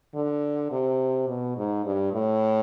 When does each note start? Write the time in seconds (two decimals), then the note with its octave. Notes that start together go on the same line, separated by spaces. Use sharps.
0.15 D3
0.71 C3
1.28 B2
1.57 G#2
1.85 G2
2.13 A2